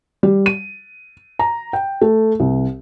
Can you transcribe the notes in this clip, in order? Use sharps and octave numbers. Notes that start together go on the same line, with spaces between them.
G3
D#7
A#5
G5
A3
C2